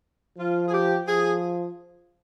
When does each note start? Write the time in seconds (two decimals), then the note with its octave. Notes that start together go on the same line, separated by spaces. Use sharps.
0.38 F3 F4
0.68 G#4
0.73 G4
1.07 F3 G#4